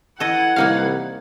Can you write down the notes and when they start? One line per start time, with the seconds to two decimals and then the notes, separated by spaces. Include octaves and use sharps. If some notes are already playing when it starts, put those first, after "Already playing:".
0.20 E3 E4 A4 D#5 F#5 G#6
0.56 C2 A#3 D#4 F5